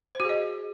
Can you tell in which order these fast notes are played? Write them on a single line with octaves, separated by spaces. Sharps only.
C5 F#4 G#4 D#5